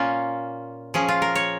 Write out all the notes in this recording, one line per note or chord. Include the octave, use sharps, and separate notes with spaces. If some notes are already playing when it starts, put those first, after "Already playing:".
Already playing: A#2 A#3 C#4 F4
F3 C#4 G#4
F4
A#4
C#5